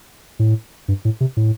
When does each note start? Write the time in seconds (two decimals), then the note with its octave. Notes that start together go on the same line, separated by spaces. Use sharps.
0.39 A2
0.88 G2
1.05 A2
1.21 C3
1.37 A2